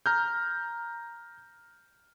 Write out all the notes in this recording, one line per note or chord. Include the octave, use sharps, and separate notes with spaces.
A#5 F6 G6